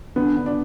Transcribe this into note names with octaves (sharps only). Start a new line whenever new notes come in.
D3 B3
D3
D4